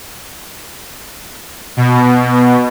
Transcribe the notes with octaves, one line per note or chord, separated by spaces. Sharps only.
B2